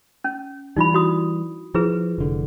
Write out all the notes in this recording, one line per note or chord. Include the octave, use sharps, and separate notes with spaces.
C#4
E3 G3 D#4 F4 B5
E4 F#4 D#6
F3 E4 G#4 B4
F1 D3